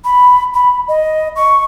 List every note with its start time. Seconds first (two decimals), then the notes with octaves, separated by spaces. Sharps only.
0.04 B5
0.54 B5
0.88 D#5
1.36 C#6